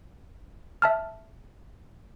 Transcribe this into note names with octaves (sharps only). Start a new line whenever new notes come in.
E5 A5 F6